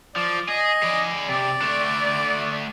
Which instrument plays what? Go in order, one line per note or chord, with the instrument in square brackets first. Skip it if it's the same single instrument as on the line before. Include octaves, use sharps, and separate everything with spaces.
[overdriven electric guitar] F3 [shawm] D5
[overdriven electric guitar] G#4 [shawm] D#5
[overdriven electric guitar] G#4 D5
[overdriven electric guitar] C3 [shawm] D5
[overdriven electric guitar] A3 D4